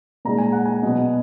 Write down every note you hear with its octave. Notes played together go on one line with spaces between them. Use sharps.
A#2 G#3 D#4 A#5
G#5
F#5
G#5
B2 F#3 B3